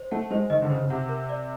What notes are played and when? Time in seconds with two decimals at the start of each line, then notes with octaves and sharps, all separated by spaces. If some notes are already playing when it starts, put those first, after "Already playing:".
Already playing: C5
0.11 A3 F#5
0.30 G#3 C5
0.50 D#3 D#5
0.62 D3
0.69 C#3 C5
0.83 C#3
0.90 C3 F#5
1.09 A#4
1.29 D5